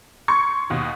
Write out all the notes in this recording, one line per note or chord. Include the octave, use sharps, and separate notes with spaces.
C6 C#6 G#6 C#7
D#2 B2